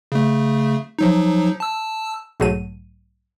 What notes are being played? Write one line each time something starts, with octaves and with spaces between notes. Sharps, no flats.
C#3 A3
F3 F#3 D#4
A5 E6
B1 G#2 F#3 A3 D#7